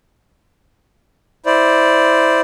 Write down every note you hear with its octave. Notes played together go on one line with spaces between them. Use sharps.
E4 C5 D5